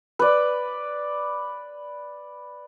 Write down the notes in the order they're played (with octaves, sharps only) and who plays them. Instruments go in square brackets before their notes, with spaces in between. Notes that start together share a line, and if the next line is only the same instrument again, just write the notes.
[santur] B4 D5